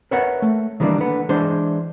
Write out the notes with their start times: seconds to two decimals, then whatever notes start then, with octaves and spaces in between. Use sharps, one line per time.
0.11 A#4 B4 C#5 E5 F#5
0.42 A3
0.80 D#3 E3 G3 A#3 C#4 D4
0.98 D3 B3
1.29 E3 G#3 D4 C5